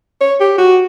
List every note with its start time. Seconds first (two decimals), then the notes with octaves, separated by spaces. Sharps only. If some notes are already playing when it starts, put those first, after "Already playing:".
0.21 C#5
0.41 G4
0.58 F#4